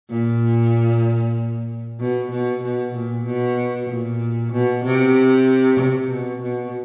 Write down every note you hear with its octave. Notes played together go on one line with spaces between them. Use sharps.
A#2
B2
B2
B2
A#2
B2
A#2
B2
C3
C3
B2
B2